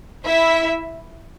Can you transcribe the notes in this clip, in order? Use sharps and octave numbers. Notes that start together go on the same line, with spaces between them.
E4 E5